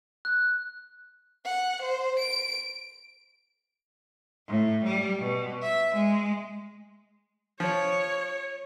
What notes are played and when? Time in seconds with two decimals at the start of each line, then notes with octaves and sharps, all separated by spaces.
0.25 F#6
1.45 F#5
1.82 C5
2.19 D7
4.48 A2
4.84 G3
5.20 B2
5.62 E5
5.95 G#3
7.60 F3 C#5